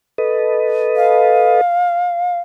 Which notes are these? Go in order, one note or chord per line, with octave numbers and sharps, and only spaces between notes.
A4 B4 D#5
F5